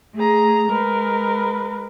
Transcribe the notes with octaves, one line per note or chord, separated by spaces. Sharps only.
A3 G#4 A#5
G#3 A#4 B4